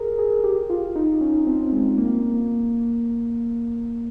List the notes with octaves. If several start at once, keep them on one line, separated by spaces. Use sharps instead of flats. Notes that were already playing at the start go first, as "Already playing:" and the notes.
Already playing: G#4 A#4
G#4
G4
F4
D#4
C#4
C4
G#3
A#3